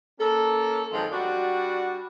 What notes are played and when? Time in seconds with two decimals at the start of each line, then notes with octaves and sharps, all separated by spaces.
0.20 A#3 C#4 A4
0.93 F#2 D#3 F3 G#3 C4
1.12 G3 D4 F#4